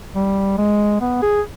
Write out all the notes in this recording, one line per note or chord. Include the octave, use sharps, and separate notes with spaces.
G3
G#3
B3
G#4